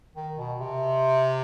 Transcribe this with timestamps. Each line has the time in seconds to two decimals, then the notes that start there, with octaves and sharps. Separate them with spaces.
0.15 D#3
0.38 B2
0.60 C3